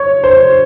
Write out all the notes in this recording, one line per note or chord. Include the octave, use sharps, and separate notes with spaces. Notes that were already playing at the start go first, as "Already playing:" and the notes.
Already playing: C#5
C5